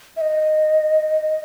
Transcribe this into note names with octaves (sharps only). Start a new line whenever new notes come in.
E5
D#5